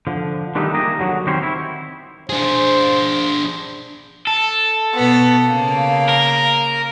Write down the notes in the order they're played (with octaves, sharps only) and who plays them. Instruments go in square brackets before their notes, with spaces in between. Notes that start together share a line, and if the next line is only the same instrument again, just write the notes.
[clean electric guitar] D3 F3
D3 D#3 G3 A3 B3 D#4
A#3 D#4 G4 G#4 D#5
D3 F#3 F#4
D#3 G3 C4 C#4 C5 C#5
E4
[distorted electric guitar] D4 G#4 [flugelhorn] C5
[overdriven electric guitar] A4
[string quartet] B2 B3
C#3 A#3
[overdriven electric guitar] A#4